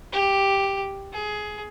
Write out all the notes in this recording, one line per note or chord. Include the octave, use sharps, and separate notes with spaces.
G4
G#4